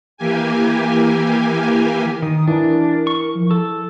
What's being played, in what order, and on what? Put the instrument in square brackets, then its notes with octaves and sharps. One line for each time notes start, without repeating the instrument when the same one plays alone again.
[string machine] E3 A#3 G4 G#5
[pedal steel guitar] D#3 [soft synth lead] D#6
[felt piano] E3 [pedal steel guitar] D4 [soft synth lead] A#4
[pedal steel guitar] C#6
[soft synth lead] F3
[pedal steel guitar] A4